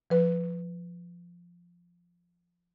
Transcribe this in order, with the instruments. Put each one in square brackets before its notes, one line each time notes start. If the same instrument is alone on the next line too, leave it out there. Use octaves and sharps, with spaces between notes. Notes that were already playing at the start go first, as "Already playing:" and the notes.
[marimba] F3 B4